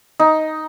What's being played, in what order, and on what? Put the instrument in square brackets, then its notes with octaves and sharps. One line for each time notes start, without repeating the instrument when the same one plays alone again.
[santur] D#4